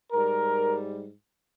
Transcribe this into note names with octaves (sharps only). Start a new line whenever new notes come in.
G#2 G3 A#4